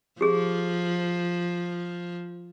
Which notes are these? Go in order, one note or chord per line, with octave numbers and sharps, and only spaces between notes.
F3 G4 G#4